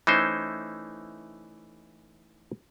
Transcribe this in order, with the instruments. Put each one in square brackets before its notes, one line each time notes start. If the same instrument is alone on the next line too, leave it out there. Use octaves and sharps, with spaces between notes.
[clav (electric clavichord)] E3 A3 C#4 D#4 E4 C5